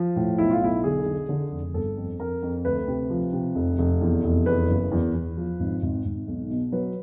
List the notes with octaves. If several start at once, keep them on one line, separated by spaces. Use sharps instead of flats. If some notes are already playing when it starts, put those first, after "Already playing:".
Already playing: F3
A2
B1 E4
F4
B1 E4
D3 G#4
D3
D3
F1
G1 A4
F2
F2 A#4
F2
D2 B4
C3
F3
C3
F1
F1
E2
F1
E2 B4
F#1
E2
E2
F3
G#1
G#1
G#1
B1
B2
F#3 B4